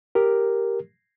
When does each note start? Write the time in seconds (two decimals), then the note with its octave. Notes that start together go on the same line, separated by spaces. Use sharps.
0.15 G4 A#4